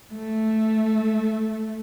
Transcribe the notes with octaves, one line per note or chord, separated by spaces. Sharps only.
A3